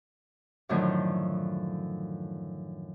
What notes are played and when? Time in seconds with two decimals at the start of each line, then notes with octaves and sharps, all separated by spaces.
0.69 F#2 A2 D3 D#3 F3 F#3